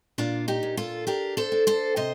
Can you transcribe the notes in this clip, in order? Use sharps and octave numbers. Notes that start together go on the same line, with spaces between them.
A#2 D4 F4
D#4 G4
A#2
F4 A4
D4 G4 A#4
A4 C5
D4
A4 C5
C3 C5 D#5